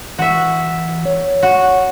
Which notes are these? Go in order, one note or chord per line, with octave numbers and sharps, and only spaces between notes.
E3 F#4 E5
C#5
F#4